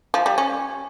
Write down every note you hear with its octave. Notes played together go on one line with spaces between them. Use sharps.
F3
G3
C#4